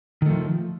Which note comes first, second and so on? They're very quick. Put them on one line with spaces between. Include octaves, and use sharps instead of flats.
D#3 A3 F3